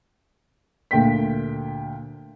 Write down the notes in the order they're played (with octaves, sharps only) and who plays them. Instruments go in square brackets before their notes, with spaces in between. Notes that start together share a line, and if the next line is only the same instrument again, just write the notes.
[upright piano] D2 A#2 G5 B6